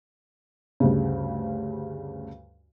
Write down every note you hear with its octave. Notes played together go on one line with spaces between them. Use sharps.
D2 G2 C#3